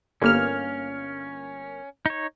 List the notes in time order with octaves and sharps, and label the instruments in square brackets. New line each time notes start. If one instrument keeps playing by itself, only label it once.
[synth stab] G1 A#3 F6 [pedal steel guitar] C#4
[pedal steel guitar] D#4 C#5